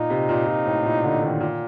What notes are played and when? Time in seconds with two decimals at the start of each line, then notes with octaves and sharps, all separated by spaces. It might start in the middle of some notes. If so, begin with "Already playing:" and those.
Already playing: A#2 D#4
0.10 C3
0.29 A#2
0.46 A#2
0.65 A2
0.85 A#2
1.03 D3
1.23 D#3
1.40 A#2